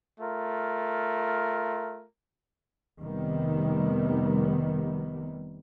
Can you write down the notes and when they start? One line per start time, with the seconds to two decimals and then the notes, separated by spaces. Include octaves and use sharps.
0.20 A3 F4 A#4
3.00 F1 C3 D#3 G3 B3